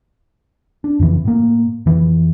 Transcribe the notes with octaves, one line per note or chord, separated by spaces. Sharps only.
D4
F2 C#3 E3
A2 A#3
F2 E3